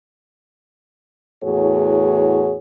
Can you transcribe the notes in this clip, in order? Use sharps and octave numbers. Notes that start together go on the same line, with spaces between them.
E2 A2 F#4 G#4 C#5